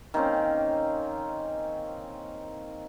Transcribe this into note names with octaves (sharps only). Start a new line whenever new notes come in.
D#3 A#3 C4 C#4